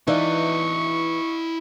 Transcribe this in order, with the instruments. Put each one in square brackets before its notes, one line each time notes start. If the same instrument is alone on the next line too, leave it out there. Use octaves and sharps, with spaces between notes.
[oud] E3 [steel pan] D#4 D5 F5 [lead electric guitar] E4 D#5 [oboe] C#6